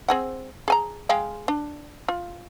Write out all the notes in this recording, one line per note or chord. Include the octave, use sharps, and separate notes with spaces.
C4 G#4 F#5
G#4 G#5 A#5
G#3 F5 G5
D4
F4